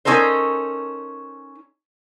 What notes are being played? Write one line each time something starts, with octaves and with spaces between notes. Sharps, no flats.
C#4 D#4 A4 A#4 C5